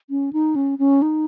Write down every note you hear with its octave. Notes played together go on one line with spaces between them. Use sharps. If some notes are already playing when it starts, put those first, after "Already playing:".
C#4
D#4
C#4
C#4
D#4